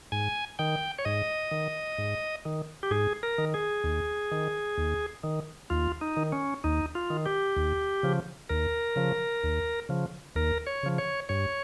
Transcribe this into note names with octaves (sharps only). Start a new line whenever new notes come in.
G#2 G#5
D#3 G5
C#5
G#2 D#5
D#3
G#2
D#3
G4
G#2 G#4
A#4
D#3
G#4
D#2
D#3
D#2
D#3
D#2 F4
D#4
D#3
C#4
D#2 D#4
F4
D#3
G4
D#2
C#3 F3
D#2 A#4
C#3 F3
D#2
C#3 F3
D#2 A#4
C#5
C#3 F3
C#5
G2 C#5